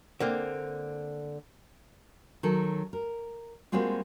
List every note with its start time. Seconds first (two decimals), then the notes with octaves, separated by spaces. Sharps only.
0.20 D3 A#3 C4
2.43 D#3 F#3 A4
2.93 A#4
3.72 G3 G#3 A#3 C4 F4 F#4